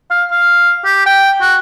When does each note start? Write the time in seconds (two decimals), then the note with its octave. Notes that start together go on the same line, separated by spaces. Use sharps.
0.11 F5
0.31 F5
0.85 G4
1.06 G5
1.41 F#4